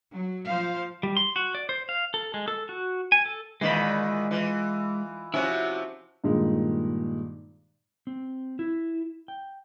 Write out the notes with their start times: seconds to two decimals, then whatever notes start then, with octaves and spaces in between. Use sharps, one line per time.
0.14 F#3
0.47 F3 C5 F5
1.03 G3
1.17 C6
1.36 F#4
1.55 D5
1.69 C5
1.89 F5
2.14 A4
2.34 G#3
2.48 A4
2.69 F#4
3.12 G#5
3.25 A4
3.61 A#2 D#3 E3 G#3 B5
4.31 E3 F4
5.34 C3 F3 C#4 E4 F#4
6.24 G2 A#2 D#3 G#3
8.07 C4
8.59 E4
9.28 G5